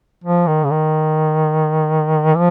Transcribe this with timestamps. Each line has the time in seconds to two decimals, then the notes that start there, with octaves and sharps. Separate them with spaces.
0.24 F3
0.47 D#3
0.64 C#3
0.71 D#3
2.35 F3